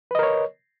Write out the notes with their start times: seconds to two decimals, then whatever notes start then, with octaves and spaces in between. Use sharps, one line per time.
0.11 B4
0.15 D#5
0.19 A#4
0.23 C#5